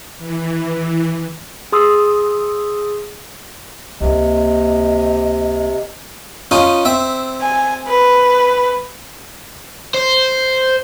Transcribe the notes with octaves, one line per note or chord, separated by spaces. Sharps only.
E3
G#4 C6 D#6 E6
C#2 C3 A#3 D#5
C#4 D#4 F4
C4 E5
G#5
B4
C5